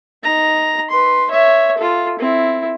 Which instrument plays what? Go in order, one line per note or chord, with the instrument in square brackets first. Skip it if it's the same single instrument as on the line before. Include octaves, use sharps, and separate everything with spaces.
[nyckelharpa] D#4 A#5
B4 C6
C#5 E5
F4 A4
C4 E4